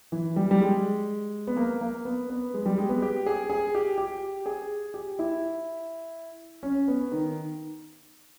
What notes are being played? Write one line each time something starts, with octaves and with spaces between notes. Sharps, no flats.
E3
G3
G3
G#3
B3
A#3
A#3
B3
B3
G#3
G3
G#3
B3
G4
G#4
G#4
G4
G4
G#4
G4
E4
C#4
B3
D#3